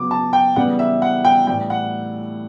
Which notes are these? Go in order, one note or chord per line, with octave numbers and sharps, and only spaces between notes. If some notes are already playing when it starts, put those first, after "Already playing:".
Already playing: C#3 F#3 B3 D6
A5
G5
E2 C#3 E3 G3 B3 F#5
E5
F#5
G5
A2 E3 G3 G5
F#5